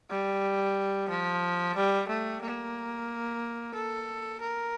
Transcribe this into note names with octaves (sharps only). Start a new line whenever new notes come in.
G3
F3
G3
A3
A#3
A4
A#4